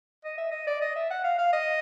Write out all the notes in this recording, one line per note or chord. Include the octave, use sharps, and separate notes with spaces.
D#5
E5
D#5
D5
D#5
E5
F#5
F5
F5
D#5